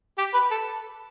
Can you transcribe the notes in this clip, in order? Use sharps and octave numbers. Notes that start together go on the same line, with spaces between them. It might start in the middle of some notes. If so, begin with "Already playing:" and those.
G4
B4
A4